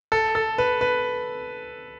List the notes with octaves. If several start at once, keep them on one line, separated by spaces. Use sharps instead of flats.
A4
A4
B4
B4